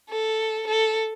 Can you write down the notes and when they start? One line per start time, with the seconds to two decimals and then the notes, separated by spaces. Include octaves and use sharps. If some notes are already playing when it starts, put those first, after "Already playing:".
0.10 A4
0.68 A4